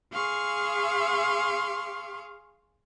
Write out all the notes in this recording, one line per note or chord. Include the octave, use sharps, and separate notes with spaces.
G#4 F5 C6 C#6